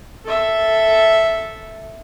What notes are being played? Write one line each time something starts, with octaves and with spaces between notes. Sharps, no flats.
A4 E5